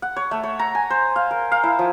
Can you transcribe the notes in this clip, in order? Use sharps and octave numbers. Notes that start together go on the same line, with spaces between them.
F#5
C#5
A3
C#5
A#5
G#5
C5
F5
A#4
F5
E4
F3